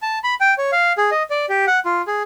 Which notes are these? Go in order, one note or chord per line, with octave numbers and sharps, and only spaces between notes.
A5
B5
G5
C#5
F5
G#4
D#5
D5
G4
F#5
F4
G#4